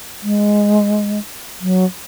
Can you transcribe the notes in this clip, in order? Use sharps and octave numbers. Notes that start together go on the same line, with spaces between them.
G#3
F#3